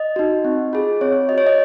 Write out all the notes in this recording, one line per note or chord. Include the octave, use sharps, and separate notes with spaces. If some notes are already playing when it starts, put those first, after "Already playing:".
Already playing: D#5
D#4 F#4
C4
F4 G#4
C4 C#5
F#4 D#5
C#5
D#5